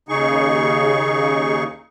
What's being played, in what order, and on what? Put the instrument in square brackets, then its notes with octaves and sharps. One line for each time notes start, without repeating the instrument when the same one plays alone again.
[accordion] D#2 C#3 D#4 G#4 C#6